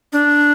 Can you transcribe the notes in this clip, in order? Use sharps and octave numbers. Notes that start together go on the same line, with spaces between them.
D4